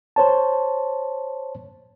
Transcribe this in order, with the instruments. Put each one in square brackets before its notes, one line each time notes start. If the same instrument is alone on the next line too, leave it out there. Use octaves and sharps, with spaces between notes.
[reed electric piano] C5 C#5 A5